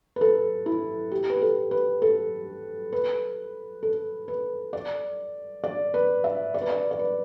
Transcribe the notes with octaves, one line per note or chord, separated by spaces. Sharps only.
B4
A4
E4
G4
B4
A4
B4
A4
B4
A4
B4
D5
D5
B4
E5
D5
B4
D5
D5
B4